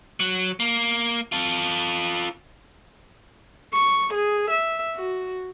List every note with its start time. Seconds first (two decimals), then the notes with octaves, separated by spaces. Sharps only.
0.20 F#3
0.60 A#3
1.32 F4 A4
3.73 C#6
4.14 G#4
4.51 E5
4.96 F#4